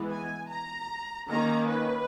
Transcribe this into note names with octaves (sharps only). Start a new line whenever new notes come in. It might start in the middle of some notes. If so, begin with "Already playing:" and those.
Already playing: E3 G#3 B3
G#5
A#5
D#3 A#3 C#4 A#5
B4